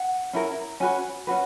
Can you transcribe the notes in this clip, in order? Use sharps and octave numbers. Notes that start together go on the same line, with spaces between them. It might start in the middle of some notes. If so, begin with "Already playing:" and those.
Already playing: F#5
C#4 E4 A#4
C#4 F#4 B4 G#5
C#4 F#4 B4